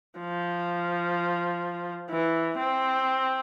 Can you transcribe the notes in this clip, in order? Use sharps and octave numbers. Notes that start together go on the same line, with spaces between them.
F3
E3
C4